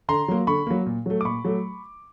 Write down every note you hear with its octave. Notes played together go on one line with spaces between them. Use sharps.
D3 A#5 C6
F#3 A#3
D3 B5 C#6
F#3 A#3
A#2
F#3 A3
D6
A#2 B5 C#6
F#3 A3